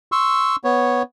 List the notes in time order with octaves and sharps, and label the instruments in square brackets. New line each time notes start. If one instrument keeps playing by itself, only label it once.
[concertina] C6 C#6 E6
B3 C#5